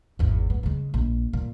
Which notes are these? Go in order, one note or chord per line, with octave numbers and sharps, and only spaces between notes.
G#1 E2
B3
C#3 G#3
A#1
A#2